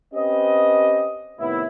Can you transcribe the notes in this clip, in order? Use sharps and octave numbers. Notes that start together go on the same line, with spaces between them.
C4 C#4 G4 B4 D#5
A2 C3 D#3 B3 E4